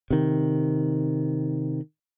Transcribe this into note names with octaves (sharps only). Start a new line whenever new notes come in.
C3 D#3